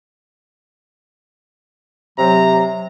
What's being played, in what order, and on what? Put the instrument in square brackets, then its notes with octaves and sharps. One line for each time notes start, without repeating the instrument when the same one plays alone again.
[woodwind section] C3 F#3 [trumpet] A#5